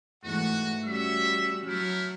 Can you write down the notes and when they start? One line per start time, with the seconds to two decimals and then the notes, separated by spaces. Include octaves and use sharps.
0.24 E2 G#2 A3 F#4 F#5
0.85 G3 C#4 F#4 E5 E6
1.66 F#3 A3 E4 F6